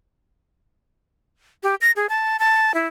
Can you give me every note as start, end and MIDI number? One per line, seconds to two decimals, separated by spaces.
1.63 1.75 67
1.81 1.91 94
1.96 2.07 68
2.09 2.37 81
2.39 2.74 81
2.74 2.87 64